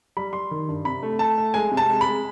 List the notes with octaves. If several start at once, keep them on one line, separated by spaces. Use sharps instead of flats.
G3 B5
G3 C6
D#3
G2
C3 B5
A3
A3 A5
A3
G#3 G#5
C3
A5
G#3
B5
G#3